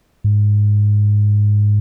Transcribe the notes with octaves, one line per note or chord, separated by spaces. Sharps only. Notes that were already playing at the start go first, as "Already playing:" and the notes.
G#2